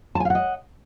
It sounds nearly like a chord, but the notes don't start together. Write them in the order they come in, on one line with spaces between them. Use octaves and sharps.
A5 G#5 F5 F#5 D#5